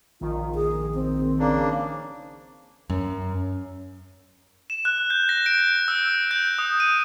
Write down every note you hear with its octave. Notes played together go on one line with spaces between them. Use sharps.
A#1 D#3 F4
G#4
C4
C#3 A#3 D4
F#2
E7
F#6
G6
A#6
D7
E6
G6
D#6
D#7